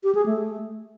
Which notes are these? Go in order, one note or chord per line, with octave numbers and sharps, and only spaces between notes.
G4
G#4
A3